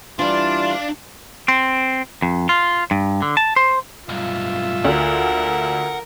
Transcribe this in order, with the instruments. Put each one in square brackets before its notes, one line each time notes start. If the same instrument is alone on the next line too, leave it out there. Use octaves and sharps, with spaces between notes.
[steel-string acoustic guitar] E3 G3 [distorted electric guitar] D4 [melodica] F4 [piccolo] F5
[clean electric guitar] C4
F2
F4
G2
D3
A5
C5
[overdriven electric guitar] B1 G2 [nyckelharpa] F4 E5
[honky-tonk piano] D2 [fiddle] A#4 [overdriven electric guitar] F#5